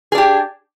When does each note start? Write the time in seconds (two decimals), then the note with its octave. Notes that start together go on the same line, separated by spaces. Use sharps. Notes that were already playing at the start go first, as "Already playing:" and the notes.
0.12 G#4
0.15 D4
0.18 G4